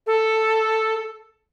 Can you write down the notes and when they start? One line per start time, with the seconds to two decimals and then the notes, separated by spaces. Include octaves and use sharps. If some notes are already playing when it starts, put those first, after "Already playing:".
0.07 A4